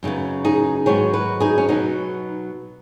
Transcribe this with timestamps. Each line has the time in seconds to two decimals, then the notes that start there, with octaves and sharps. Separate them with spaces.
0.03 F#2 C#3 B3 D#4
0.45 D#4 G#4
0.86 G#2 D#3 F#3 B3 G#4 C#5
1.13 F#4 B4
1.40 D#4 G#4
1.58 C#4
1.68 B2 F#3 B3 D#4